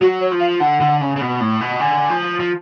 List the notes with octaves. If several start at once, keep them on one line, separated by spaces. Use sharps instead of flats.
F#3 F#4
C#5
F3
F5
D3 F#5
D3
C#3
C#3
B2
A2
B2
D3 G#5
F3
F3